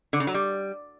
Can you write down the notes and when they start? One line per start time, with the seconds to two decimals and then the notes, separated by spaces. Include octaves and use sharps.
0.13 D3
0.20 C#3
0.27 F#3
0.34 G3